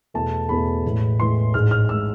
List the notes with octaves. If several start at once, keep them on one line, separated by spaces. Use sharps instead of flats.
E2 B2 A3 A5
E2 B2 A3 B5
A1 A2 E3 G#3
A1 A2 E3 G#3 C6
A1 G#2 G#3 F6
F6
A1 G#3 E6